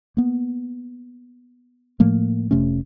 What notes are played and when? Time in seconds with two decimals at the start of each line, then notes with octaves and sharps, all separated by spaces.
0.17 A#3 B3
2.00 A2 F3 A3 A#3
2.51 F1 C3 A3 C#4